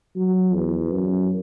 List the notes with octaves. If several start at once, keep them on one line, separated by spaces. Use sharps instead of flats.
F#3
E2
F#2